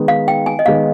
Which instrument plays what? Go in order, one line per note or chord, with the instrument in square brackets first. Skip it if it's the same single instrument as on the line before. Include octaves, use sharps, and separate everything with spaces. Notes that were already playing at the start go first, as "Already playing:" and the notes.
Already playing: [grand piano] D#3 G#3 B3 D#4
[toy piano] F5
G5
G#5
D#5
[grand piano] D#3 G#3 B3 D#4 [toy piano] F5